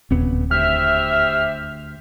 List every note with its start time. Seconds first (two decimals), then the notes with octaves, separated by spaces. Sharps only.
0.11 E1 D#2 A#2 C#3 B3 C4
0.51 D2 G4 C5 E5 F6